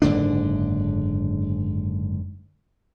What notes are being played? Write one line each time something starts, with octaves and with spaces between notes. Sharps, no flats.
F#1 G#2 D3 D4